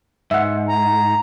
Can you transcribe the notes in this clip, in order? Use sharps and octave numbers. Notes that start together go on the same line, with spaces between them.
G#2 E5 F#5
A#5